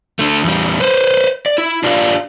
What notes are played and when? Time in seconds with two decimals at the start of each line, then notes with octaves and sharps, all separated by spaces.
0.19 D3 A3
0.43 E2 G3
0.80 B4 C5
1.46 D5
1.58 E4
1.84 D4 F4 G4 D5 F5